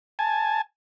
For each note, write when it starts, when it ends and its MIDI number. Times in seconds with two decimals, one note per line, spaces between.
0.19 0.61 80
0.19 0.61 81